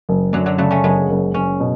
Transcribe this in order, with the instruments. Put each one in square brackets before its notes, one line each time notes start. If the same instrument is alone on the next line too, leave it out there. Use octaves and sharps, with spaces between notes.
[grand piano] F#1
[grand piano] F#2 [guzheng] D3 F#3
[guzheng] D3 F#3
[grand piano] C#3 [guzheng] F#3 A3
[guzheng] A3 C#4
[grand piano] F#1 [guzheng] G#3 B3
[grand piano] F#1
[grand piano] F#1 [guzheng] C#4
[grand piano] B2